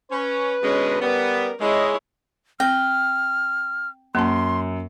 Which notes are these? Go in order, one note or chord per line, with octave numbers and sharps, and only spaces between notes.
C#4 B4
B2 D3 G#3 C#4
G3 B3 A#4
G#3 E4 C#5 D#5
C4 G5 F6
F#2 A#3 A5 C6